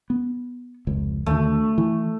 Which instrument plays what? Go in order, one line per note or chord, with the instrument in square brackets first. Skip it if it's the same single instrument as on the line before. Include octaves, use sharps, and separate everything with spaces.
[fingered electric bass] B3
F1 C#2
[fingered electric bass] D#2 D3 [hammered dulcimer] A3
[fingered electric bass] E3